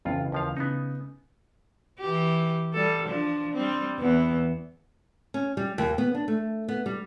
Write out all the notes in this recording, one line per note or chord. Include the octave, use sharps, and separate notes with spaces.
B1 F2 C#3 E3 E4 F4
D#2 F3 F5
C#3 B3 D#4
E3 G4
G3 A4
F3 D4
G3 C4
E2 E3 B3
C#4
G3
D#2
B3
D4
A3
B3
G3